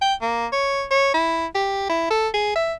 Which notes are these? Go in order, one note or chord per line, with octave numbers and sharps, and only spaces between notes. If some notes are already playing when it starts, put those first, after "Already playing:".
G5
A#3
C#5
C#5
E4
G4
E4
A4
G#4
E5